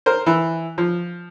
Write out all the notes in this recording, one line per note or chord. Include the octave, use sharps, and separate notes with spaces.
A#4 C5
E3
F3